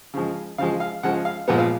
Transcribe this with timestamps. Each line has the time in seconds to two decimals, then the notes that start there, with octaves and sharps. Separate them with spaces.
0.14 C#3 F3 G#3
0.58 C#3 F3 G#3 F5
0.80 F5
1.03 C#3 F3 G#3 F#5
1.25 F5
1.48 A#2 F3 G#3 B3 F#5
1.59 F5